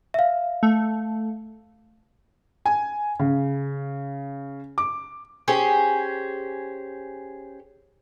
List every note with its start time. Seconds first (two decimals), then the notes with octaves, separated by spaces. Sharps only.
0.14 E5 F5
0.63 A3
2.66 G#5
3.19 C#3
4.78 D6
5.48 C#4 G4 G#4 C5